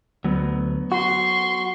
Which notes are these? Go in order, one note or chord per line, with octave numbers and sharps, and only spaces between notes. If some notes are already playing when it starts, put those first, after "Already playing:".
D2 F#3 B3
F#4 C6 C#6